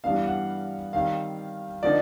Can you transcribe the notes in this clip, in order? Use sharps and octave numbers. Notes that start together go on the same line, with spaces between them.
G2 E3 G3 B3 D4 F5
F#5
D#3 G3 C4 F5
D3 F3 A#3 D#4 D5